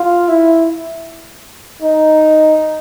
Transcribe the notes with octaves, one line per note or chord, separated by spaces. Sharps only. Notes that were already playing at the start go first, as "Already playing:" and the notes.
Already playing: F4
E4
D#4